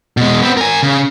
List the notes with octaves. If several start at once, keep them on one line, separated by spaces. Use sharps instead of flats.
B2 G#3
B3 C4
A#4 G#5
C#3